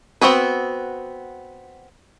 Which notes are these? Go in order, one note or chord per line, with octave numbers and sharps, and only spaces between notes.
B3 C4 F#4 G#4 B4